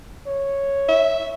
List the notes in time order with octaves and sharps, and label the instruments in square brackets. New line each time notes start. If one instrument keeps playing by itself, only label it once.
[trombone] C#5
[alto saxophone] E5